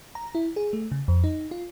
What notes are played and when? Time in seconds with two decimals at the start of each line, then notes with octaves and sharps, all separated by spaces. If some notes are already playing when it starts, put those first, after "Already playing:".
0.15 A#5
0.35 E4
0.56 G#4
0.73 A3
0.92 C#3
1.08 F2
1.24 D#4
1.51 F4